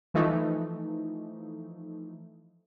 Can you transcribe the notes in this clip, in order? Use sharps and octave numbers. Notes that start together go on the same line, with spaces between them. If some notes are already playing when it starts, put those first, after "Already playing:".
E3 F3 A3 D#4